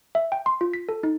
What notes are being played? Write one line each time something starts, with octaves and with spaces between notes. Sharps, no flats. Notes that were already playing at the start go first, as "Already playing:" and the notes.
E5
G5
C6
F4
B6
A4
D#4